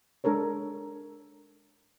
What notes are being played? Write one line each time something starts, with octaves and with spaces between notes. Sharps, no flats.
G#3 D4 A4 A#4 C#5